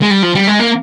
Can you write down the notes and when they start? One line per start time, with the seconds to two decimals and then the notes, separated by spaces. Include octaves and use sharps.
0.02 G#3
0.10 G3
0.23 F3
0.35 G3
0.47 G#3
0.59 A#3